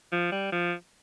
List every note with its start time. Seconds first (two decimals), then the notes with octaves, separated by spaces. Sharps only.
0.12 F3
0.32 G3
0.52 F3